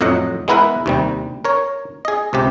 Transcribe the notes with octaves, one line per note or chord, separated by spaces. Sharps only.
F2 A2 F#3 D#5 F#5
G#3 B3 E4 A#4 B4
D#2 C3 G3
A#4 C#5
G#4 D#5
C#2 C3 G4